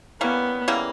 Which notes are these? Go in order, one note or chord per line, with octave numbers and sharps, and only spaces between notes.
E3 G3 A#3 B3 C#4
C#3 E3 G3 A#3